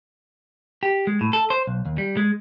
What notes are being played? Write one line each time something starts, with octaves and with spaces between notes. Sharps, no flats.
G4
G#3
A2
A4
C5
B1
D#2
G3
G#3